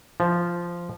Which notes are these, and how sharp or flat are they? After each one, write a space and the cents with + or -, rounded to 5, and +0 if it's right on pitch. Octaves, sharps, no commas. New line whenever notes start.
F3 -10